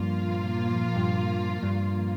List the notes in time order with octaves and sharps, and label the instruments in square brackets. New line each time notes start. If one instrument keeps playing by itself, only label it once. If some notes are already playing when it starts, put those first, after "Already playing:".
Already playing: [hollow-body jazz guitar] G2 [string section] A#2 F3 A#3 F4
[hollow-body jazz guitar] G2
G2